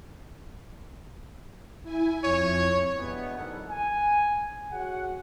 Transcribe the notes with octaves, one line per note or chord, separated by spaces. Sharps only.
E4 G#5
F2 C#5
G2 B2 E3 G#3 B3
F2 D#3 G3 E4 A4 F#5
G#5
F#4 G#4 C#5 F#5